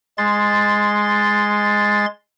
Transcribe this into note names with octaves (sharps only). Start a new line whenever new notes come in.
G#3 C6 A6